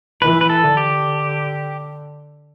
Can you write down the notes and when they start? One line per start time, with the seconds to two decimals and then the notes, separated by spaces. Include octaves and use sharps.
0.22 E3 B4
0.41 B4
0.50 A4
0.63 D3
0.77 G4